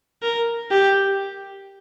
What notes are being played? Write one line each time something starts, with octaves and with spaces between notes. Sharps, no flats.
A#4
G4